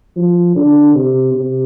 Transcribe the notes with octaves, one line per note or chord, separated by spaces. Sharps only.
F3
D3
C3
C3